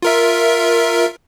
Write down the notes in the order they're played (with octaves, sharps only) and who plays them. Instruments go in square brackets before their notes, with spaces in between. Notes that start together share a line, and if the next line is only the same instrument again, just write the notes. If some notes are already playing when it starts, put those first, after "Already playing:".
[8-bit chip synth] F4 A#4 E5